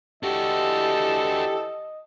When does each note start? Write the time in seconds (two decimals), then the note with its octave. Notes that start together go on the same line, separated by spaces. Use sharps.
0.23 E3 D4 F#4 G4 A4 D#5